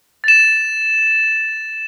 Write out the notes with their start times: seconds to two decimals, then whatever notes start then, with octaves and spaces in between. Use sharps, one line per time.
0.24 A6 E7